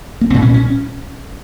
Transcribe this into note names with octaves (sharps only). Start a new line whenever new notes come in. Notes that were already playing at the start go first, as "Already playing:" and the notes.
A#3
C2 A#2 C4
C#4
C#4